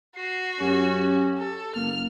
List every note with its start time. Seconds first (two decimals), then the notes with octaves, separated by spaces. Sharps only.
0.16 F#4 C7
0.60 F#2 C#4 G4
1.39 A4
1.76 F#1 A#3 F6